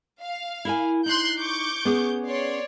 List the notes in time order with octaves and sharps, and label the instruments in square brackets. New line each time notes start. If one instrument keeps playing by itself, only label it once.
[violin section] F5
[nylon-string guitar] E4 A#4 G#5
[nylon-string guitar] D#4 [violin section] C6 F#6 G6
[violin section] C#6 D6 G6
[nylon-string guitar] B3 C#4 G#4
[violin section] C#5 D5 C6